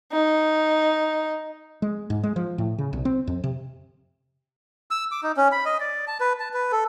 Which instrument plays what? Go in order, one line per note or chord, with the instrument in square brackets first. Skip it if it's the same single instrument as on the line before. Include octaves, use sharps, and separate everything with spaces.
[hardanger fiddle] D#4
[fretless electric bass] G#3
G#2
G#3
F3
A2
C#3
B1
C4
F2
C3
[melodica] E6
D6
D#4
C#4
B5
D#5
D5
A5
B4
A5
B4
A4